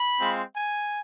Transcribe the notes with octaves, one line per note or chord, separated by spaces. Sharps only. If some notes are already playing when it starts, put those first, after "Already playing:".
Already playing: B5
G#3 C4 F4
G#5